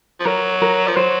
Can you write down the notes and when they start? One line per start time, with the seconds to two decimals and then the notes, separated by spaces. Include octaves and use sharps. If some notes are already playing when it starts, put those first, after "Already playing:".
0.20 F3
0.26 F#3 A#4
0.62 A#4
0.88 F3
0.97 F#3 C5